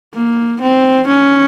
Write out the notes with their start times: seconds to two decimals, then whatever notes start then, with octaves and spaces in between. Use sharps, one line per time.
0.14 A#3
0.61 C4
1.08 C#4